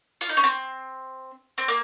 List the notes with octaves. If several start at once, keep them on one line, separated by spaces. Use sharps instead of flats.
F4
D#4
C#4
C4
C4
A#3